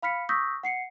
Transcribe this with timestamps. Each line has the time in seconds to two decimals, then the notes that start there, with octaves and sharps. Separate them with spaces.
0.02 F5 B5 F6 B6 C#7
0.29 C#6 D#6 E6 G6 A#6 B6
0.63 F#5 C7 C#7